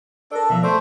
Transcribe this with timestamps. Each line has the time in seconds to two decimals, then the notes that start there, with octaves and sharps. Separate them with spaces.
0.31 D4 A4 A#4 D5
0.50 B2 F3 E5
0.63 A3 C5 D5